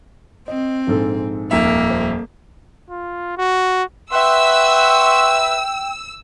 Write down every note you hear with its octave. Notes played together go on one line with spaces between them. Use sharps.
C4 D#5
A#1 G#2 A4
D#1 F2 A#3 E5
C5
F4
F#4
B4 E5 F#5 G5 C6 C#6 E6